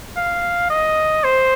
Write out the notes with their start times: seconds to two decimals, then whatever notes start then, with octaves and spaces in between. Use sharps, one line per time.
0.16 F5
0.70 D#5
1.24 C5